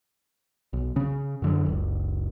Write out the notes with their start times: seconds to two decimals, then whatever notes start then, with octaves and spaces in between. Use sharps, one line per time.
0.73 B1
0.96 C#3 C#4
1.42 F#2 D3 F#3
1.66 F#1 C#2